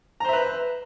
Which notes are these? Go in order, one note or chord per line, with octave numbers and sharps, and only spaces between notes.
B4 C5 E5 A#5